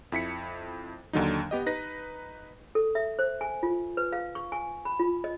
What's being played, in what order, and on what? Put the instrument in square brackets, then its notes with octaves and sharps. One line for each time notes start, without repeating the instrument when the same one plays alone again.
[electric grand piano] F2 E4 B6 C#7
D#2 D3 F#3 D#4
B3 G4 D#5
D#4 B4 A#6
[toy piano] A4
E5
C5
G#5
F4
B4
F5
C#6
G#5
B5
F4
D#5